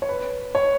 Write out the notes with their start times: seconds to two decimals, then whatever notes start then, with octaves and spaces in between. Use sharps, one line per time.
0.02 C#5
0.09 B4
0.55 C#5